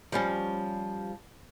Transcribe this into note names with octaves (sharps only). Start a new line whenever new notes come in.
F3 G3 C#4